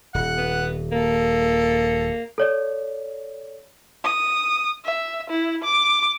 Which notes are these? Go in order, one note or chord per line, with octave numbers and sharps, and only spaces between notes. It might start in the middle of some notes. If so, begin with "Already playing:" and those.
D#1 F#5
B3
A#3 A4
A4 C#5 D5
D#6
E5
E4
D6